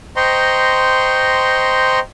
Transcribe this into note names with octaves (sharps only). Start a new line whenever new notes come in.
C5 D#5 G5 A#5 C6 C#6